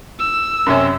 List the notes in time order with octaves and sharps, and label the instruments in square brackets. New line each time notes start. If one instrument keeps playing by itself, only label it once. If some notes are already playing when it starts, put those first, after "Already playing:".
[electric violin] E6
[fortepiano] F#2 C3 C#4